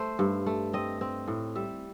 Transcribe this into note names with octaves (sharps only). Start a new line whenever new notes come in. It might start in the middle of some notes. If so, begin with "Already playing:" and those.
Already playing: A3 C5
G2
A3
C4 D#5
C4
A2
G3 E5